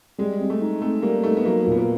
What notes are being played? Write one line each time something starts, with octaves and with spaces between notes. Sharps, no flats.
G3 G#3
C4
A3
D#4
A3 C4
G3 A#3
A3 D#4
B3
F#3 A#3
A#2
B3
A#3